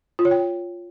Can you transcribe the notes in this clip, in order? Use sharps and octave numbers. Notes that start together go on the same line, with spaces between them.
F4
C#5
G5